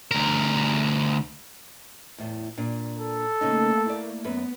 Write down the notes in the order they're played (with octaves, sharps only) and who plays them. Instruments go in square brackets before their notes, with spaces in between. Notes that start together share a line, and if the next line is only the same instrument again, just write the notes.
[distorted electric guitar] D2 A#4
[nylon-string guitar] E2 A2
A#2 D4
[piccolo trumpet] A4
[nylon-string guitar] C#3 C#4 D#4 [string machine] A3 A#3
[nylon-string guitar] E4 D5
[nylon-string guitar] F#2 B4 [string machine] B3